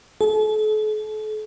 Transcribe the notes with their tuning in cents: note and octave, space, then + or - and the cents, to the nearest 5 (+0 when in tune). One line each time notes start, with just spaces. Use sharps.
A4 -40